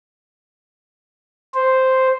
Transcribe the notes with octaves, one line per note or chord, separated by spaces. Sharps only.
C5